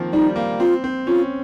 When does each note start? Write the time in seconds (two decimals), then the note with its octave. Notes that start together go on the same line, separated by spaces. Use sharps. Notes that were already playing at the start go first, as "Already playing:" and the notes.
Already playing: D#3 F3 A#3 C4
0.13 G3 D#4
0.36 A#3
0.60 C4 F4
0.84 C4
1.07 C#4 F4